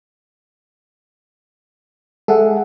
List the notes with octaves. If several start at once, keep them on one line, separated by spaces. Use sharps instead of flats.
G#3 G#4 A4 E5 F#5